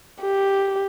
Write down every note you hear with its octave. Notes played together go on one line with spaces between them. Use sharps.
G4